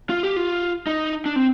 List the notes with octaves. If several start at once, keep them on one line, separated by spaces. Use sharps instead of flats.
F4
G4
F4
D#4
D4
C4